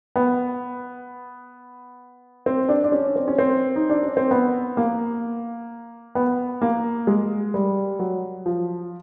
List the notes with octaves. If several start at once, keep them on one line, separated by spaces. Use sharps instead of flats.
B3
C4
D4
D4
C#4
C4
C#4
C4
D#4
D4
C#4
C4
B3
A#3
B3
A#3
G#3
G3
F#3
F3